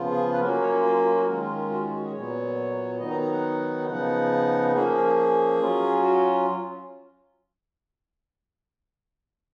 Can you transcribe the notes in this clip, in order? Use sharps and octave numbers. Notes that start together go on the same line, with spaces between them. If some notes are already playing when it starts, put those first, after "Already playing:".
Already playing: C#3 F3 B3 F4
G#4
B4
F#3 A#3 C#4 A#4
C#5
F4
F4
F4
F#4
D#3 G#3 C#4 F4 A#4
A#4
A#4
F#4
F4
F#4
G#4
A#2 F#3 B3 C#5
D#3 F#3 B3 D#4 D#5
A#5
A#5
F#5
C#3 F3 B3 D#4 F#5
F3 A#3 C#4 G#4
A#4
G#4
G#4
G#4
F#3 C#4 F4
F#4